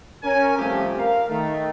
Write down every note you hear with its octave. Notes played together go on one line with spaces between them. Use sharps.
C#4 A#4 G#5
C3 F3 G3 A3 C4 G4
A#4 F5
D#3 A3